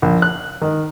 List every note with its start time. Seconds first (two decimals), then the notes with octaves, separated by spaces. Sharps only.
0.02 A#1
0.22 F#6
0.62 D#3